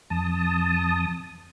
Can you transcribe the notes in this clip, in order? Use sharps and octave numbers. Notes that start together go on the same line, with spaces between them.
F2 A5 D#6